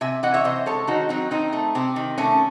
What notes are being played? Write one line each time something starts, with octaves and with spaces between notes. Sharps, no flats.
C3 E5 G#5
E3 D#5 F#5
C#5 E5
C3 C5 D#5
G#3 A4 C#5
D#3 D#4 F#4
F#3 C4 D#4
D#3 C4 D#4
A3
C3 C4
D#3
C3 A3 C#4